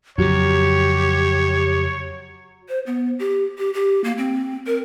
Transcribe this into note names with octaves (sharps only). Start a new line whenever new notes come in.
F2 C#3 F#3 G4 C#5
C5
B3
G4
G4
G4
A#3
C4
A#4